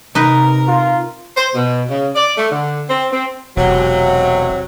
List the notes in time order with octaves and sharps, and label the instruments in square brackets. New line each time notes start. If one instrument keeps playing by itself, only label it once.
[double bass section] C3 [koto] D#4 B4 [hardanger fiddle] A#4
[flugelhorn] F4
[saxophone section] C5
B2
C#3
D5
A3
D3
C4
C4
[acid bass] E1 [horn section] C3 F#3